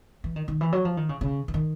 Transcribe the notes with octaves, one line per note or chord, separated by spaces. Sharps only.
E3
D#3
D#3
E3
F#3
F3
D#3
C#3
C#3
E3
D#3